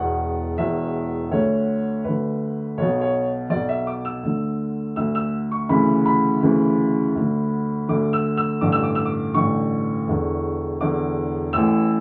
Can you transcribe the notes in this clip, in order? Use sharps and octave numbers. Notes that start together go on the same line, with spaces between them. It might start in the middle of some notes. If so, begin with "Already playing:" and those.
Already playing: E1 E2 B2 F#5
E1 E2 B2 E5
D2 D3 C#5
D2 D3 B4
B1 B2 C#5
C#5
B1 B2 D5
E5
D6
E6
D2 D3
D2 D3 E6
E6
C#6
D2 C#3 E3 B5
B5
D2 C#3 E3
D2 D3
D2 D3 D6
E6
E6
A1 G2 D3 D6
E6
D6
E6
D6
A1 G2 D3 C#6
E1 E2 D3
E1 E2 D3 D6
A1 A2 E3 E6